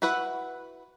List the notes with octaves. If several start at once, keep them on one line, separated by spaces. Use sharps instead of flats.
E4 F#4 B4 E5 F#5